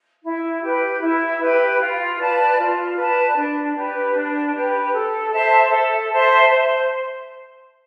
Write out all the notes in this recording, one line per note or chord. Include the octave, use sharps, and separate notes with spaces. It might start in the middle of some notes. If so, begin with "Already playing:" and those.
E4
G4 B4
E4
G4 B4
F4
B4 D5 A5
F4
B4 D5 A5
D4
G4 B4
D4
G4 B4
A4
C5 E5 A5
A4
C5 E5 A5
C5